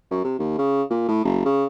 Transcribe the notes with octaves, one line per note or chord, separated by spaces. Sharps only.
F#2
C3
D#2
C#3
A#2
A2
F#1
C#3